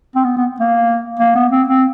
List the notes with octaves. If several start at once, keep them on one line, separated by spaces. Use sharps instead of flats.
C4
B3
B3
A#3
A#3
B3
C4
C4